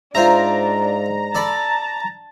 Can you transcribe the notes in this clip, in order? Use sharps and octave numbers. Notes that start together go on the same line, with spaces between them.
G#2 D4 F4 C5 E5 A#5
A4 D5 A5 B5